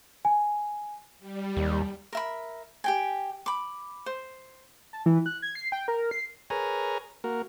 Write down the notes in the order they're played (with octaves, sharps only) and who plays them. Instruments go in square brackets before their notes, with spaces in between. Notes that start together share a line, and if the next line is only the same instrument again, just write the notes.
[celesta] G#5
[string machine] G3
[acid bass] D#2
[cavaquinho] A#4 E5 B5
G4 G5 G#5
B5 D6
C5
[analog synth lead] A5
E3
F#6
G#6
C7
G5
A#4
C7
[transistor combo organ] G#4 A#4 B4 C#5 G#5 A#5
A#3 F#4 A#4